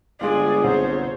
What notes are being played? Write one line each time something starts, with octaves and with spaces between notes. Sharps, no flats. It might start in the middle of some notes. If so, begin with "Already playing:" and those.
G1 G#3 F4 G#4 D5 G#5
C2 C5 C#5